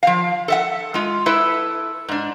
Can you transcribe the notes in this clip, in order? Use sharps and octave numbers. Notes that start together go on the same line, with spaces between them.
F3 F5
A4 E5 F#5
G#3 F4
E4 A4 B4 E5
G#2 D4